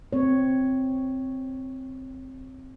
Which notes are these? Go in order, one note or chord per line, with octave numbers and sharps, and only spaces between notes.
C4 C#5